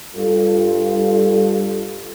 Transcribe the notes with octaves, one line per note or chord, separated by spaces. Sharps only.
G2 G3 F4 A4